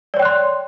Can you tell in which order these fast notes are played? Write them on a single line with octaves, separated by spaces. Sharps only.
D5 C#5 G5 F#6 C6